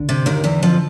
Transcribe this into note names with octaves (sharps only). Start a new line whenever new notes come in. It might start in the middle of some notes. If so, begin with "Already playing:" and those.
Already playing: D3
C3
D#2 D#3
E2 E3
F2 F3